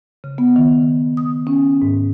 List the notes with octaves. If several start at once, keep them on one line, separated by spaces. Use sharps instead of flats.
C#3
B3
D#3
D#6
C#4
G#2